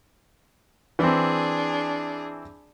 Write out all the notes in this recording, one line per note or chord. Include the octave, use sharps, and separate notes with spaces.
E3 C4 D4 G#4